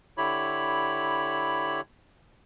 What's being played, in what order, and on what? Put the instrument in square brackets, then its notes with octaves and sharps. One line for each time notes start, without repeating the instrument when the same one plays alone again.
[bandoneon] D3 E4 G4 C#5 B5